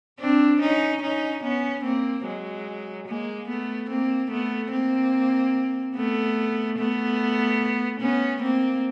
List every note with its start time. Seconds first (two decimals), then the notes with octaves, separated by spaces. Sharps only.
0.19 C4 D4
0.61 C#4 D#4
1.02 C#4 D#4
1.43 B3 C#4
1.84 A#3 C4
2.25 F#3 G#3
3.07 G#3 A#3
3.48 A3 B3
3.89 A#3 C4
4.30 A3 B3
4.72 A#3 C4
5.95 A3 B3
6.78 A3 B3
8.01 B3 C#4
8.42 A#3 C4